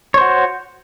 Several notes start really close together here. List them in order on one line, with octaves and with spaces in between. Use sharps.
C#5 C5 F#4